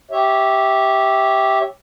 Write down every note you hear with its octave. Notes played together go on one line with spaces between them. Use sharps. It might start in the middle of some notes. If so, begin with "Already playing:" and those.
G4 C#5 E5